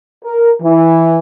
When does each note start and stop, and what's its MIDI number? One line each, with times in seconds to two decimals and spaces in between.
0.25 0.52 70
0.62 1.19 52